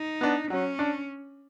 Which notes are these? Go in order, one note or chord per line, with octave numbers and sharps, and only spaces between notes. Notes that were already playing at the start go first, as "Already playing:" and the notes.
Already playing: D#4
B3 D4
F#3 C#4
D4